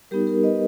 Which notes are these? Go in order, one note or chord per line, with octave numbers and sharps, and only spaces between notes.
G3 B3 D#4 G4 A#4
G4 A#4
B4 D#5